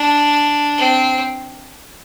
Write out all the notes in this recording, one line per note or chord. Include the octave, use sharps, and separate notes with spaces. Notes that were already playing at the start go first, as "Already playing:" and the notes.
Already playing: D4
C4